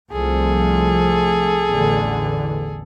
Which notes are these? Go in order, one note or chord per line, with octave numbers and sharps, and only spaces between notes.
C2 F3 A3 G#4 A4
A1 E2 D3